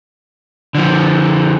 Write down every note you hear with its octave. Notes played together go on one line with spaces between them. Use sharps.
D3 F3